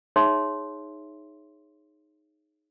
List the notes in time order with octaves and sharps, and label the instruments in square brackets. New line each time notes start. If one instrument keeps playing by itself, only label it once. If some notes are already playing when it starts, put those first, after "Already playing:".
[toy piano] D#4 G#4 C#5 E5 C6